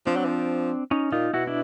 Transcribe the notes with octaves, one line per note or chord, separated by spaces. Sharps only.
F3 C4 D4
F#3
F3
C#4 D#4
A#2 D#4 F4
B2 E4 F#4
D4 E4